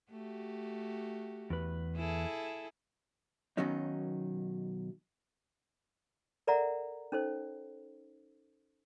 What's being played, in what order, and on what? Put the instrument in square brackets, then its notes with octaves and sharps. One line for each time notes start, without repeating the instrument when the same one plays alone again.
[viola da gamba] A3 F#4 G4
[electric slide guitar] E2 B4
[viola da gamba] E4 G#4 A4
[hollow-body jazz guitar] B1 B2 D#3 F#3 C#4 D#4
[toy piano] A4 A#4 D5 E5 F#5 A#5
C#4 D#4 A4 C5